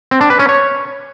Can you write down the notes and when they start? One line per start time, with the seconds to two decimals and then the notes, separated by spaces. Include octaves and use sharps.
0.11 C4
0.21 D4
0.30 B4
0.39 C#4
0.49 C#5